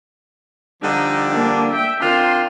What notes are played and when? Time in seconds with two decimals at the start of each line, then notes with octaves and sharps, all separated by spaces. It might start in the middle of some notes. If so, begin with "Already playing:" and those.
0.82 D3 F3 G3 D#4
1.32 A#3 D4
1.71 E5 G5
2.01 D#3 C4 D4 F4 C6